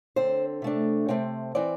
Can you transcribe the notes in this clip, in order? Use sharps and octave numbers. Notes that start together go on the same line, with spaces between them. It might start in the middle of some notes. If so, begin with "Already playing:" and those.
D3 C4 C5
C3 A3 D4
C3 A3 C4 G5
E3 C4 D5